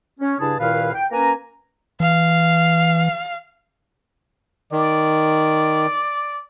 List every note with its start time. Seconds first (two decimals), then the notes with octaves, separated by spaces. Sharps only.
0.20 C#4
0.40 G2 C#3 D4 E4 G#4 A5
0.59 C2 A#2 D#3 E4 B4 F5
0.94 G5
1.11 A#3 C#4 B4 G#5 A#5
2.00 E3 F5
4.72 D#3 D5